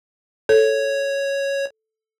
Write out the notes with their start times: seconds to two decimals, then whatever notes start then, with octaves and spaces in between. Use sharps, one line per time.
0.49 A4 C#5